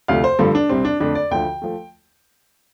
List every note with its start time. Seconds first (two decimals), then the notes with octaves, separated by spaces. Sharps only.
0.08 D2 C3 F3 A3 F5
0.24 C5
0.39 G2 D3 F3 A3 A4
0.55 D4
0.69 C2 C3 G3 C4
0.85 D4
1.00 F2 D3 A3 D4
1.15 D5
1.31 D2 D3 F3 G5
1.62 F3 A3